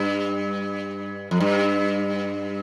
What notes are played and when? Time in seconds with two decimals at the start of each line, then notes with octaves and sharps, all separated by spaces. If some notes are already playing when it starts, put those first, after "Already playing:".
Already playing: G2
1.31 F2
1.40 G2